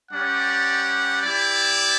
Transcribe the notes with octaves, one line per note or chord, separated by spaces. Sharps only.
G3 C#4 G4 D5 F#5
E4 G4 D5